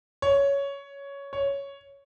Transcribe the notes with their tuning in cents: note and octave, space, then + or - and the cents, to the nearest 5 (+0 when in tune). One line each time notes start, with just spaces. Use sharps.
C#5 +10
C#5 +5